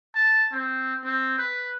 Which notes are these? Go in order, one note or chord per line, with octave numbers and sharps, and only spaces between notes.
A5
C4
C4
B4